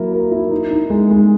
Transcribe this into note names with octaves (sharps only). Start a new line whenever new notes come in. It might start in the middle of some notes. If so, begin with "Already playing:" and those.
Already playing: F#3 A#3 E4 A#4
A#4
E4
D#4
D#4
G#3
G#3